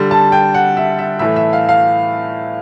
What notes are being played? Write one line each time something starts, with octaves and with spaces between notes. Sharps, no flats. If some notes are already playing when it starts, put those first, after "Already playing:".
Already playing: D3 G3
A5
G5
F#5
E5
E5
A2 E3 A3 E5
E5
F5
F5